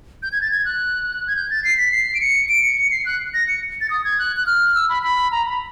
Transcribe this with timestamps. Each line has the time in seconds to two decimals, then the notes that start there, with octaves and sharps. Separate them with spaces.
0.23 G6
0.32 G#6
0.41 A6
0.52 G#6
0.65 F#6
1.27 G#6
1.36 G6
1.50 A6
1.64 C7
1.77 B6
1.91 C7
2.14 D7
2.21 C#7
2.49 D7
2.63 C#7
2.77 C#7
2.91 C7
3.06 F#6
3.34 A#6
3.48 C#7
3.81 A6
3.90 D#6
4.04 G#6
4.19 F#6
4.36 F#6
4.46 F6
4.75 E6
4.89 B5
5.03 B5
5.31 A#5
5.46 B5